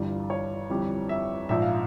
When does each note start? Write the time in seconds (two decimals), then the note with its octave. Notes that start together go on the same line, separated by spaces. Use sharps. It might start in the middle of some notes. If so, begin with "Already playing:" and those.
Already playing: G1 G2 E3 G3 F4
0.30 C#5
0.70 G1 F2 E3 G3
1.09 E5
1.49 A#1 G#2 F3 E5
1.62 F5